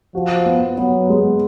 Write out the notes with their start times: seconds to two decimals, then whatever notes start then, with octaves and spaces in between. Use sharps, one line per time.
0.15 F3 F#4
0.46 B3
0.77 F#3 B3
1.09 G#3